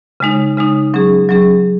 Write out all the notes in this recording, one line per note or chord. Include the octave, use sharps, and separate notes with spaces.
C#3 G#3 D#4
C#3 G#3 D#4
F#3 C#4 G#4
F#3 C#4 G#4